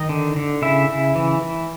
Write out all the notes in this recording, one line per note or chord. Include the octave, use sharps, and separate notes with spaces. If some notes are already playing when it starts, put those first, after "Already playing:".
Already playing: D#3 D#4 D#5
D3
D3
C#3 E4 E5
C#3
E3
E3